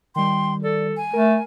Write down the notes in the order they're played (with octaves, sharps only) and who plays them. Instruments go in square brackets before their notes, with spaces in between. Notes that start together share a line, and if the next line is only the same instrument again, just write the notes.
[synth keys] D#3 G3 [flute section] G5 C6
[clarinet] A4 [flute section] D5
[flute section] G#5
[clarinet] A3 [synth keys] A#4